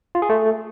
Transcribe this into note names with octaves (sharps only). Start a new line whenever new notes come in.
F4
G#4
A3